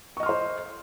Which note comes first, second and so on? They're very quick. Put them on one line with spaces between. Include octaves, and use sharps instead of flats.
C#6 D#5 F6 C6 C5